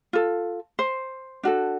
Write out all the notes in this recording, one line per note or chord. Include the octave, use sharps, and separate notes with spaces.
F4 A4
C5
D4 F#4 A4